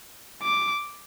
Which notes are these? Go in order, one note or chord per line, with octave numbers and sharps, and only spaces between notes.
D6